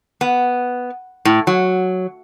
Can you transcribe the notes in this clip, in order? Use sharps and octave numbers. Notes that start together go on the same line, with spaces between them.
B3
A2
F#3